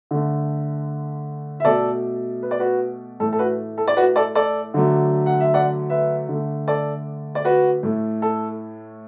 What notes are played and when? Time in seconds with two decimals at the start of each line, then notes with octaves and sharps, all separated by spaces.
0.11 D3 A3
1.60 E5
1.65 B2 A3 A4 D5
2.43 B4
2.51 D5
2.60 F#4 B4
3.20 A2 E3 A3 A4
3.33 A4
3.39 F#4 B4
3.78 A4
3.88 D5
3.97 F#4 B4
4.16 A4 D5
4.35 A4 D5
4.74 D3 F#3 A3
5.26 F#5
5.40 E5
5.54 D5 F#5
5.90 B4 E5
6.29 D3 A3
6.68 A4 D5
7.35 D5
7.45 F#4 B4
7.83 A2 A3
8.22 A4